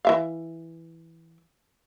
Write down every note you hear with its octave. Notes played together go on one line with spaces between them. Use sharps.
E3 E5 F5